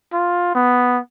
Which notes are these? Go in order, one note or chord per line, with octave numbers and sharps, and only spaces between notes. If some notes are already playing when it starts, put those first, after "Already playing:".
F4
B3